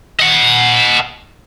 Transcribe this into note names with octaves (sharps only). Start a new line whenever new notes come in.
D#5 F#5